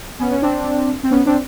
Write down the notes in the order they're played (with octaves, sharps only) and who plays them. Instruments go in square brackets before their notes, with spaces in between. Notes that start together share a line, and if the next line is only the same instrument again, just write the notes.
[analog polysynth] B3 C#4
C#4
C4 D4
C4
B3 C#4
C4 D4